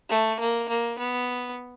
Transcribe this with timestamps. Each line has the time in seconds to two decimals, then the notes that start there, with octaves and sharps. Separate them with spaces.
0.09 A3
0.40 A#3
0.68 A#3
0.98 B3